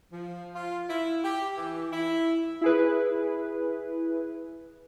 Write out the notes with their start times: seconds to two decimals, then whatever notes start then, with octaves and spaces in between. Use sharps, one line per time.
0.12 F3
0.54 F4
0.89 E4
1.23 G4
1.57 E3
1.92 E4
2.61 E4 G#4 B4